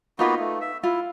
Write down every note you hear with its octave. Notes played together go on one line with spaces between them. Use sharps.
A#3 B3 D#4 F4 F#4 B4
A3
E5
E4 F4